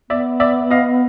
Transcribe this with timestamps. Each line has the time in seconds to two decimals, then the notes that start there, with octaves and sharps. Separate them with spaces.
0.10 B3 D5 E5
0.40 D5 E5
0.71 D#5 F5